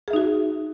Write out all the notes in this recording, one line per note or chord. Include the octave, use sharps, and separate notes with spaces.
D#4 F#4 G#4 E5